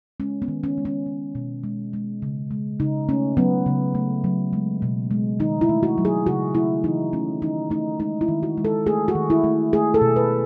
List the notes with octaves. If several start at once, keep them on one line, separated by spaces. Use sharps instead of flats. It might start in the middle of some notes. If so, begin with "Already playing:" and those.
G#3 C#4
B3
D#3
C#4
G#3
C#4
G#3
B2
G#3
G#3
C#3
G#3
C#3 D#4
A3 C#4
F#3 B3
C#3
A3
F#3
G#3
B2
G#3
D#3 D#4
E4
A3
F#4
F#3
G#4
C#3 F#4
A3 E4
E3 D#4
A3 C#4
D#3 D#4
A3 D#4
G#3 D#4
E4
D#3
F#4
G#3
A4
A3 G#4
F#4
D#3
E4
A3
A3 G#4
A4
B2
B4